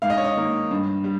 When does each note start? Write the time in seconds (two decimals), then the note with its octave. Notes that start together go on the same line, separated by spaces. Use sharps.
0.02 G#2 F5
0.10 D#5
0.17 C#5
0.24 D#5
0.36 D#3 A#3
0.71 G2
1.04 G3